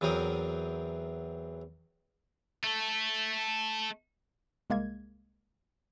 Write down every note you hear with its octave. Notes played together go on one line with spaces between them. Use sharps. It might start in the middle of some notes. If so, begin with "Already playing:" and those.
E2 E3 F#3 C4 A#4 D#6
A3 A4
C2 G#3 A#3 G#6